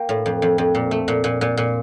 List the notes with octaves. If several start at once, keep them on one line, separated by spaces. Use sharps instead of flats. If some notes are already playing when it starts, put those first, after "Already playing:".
Already playing: A#3 G5
A2
F2
F2
F2
A#2
A3
A#2
A#2
A#2
A#2